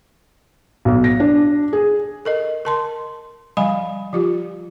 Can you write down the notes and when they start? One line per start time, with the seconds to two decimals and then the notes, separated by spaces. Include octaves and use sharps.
0.85 B1
1.04 A#6
1.20 D4
1.73 G#4
2.25 A4 A#4 D#5
2.65 A#4 A5 C6
3.57 F3 G3 F5 G#5 B5
4.13 F3 F4 G4